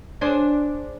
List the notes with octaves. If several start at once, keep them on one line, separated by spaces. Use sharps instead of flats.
D4 G#4 C5